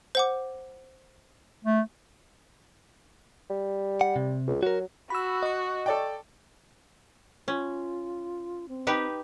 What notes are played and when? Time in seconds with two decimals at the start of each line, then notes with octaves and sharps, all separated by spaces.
0.15 C5 F#5 D6
1.65 A3
3.50 G3
4.01 F#5
4.16 C3
4.48 C#2
4.63 F#3 F#4 A#4
5.10 F#4 B5 E6
5.43 D#5 C#6
5.86 A4 D5 G5
7.48 C#4 F4
8.69 C4
8.87 D#4 G4 B4